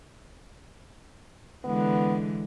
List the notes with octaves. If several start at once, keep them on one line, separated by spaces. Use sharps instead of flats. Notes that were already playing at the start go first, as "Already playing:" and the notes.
D3 E3 G#3 B3